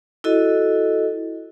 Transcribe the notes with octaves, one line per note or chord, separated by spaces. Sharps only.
E4 F#4 A4 D#5